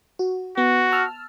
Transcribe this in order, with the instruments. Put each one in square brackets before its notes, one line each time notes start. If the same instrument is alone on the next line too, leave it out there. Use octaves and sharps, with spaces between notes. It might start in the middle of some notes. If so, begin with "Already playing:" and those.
[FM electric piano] F#4
[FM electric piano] B3 [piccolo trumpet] F#4
[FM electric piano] A5 E6 F6